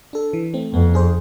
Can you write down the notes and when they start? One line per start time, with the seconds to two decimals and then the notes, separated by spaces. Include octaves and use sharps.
0.13 D4 A4
0.33 E3
0.54 A3 C4
0.73 F2 B3
0.94 D4 G#4 C5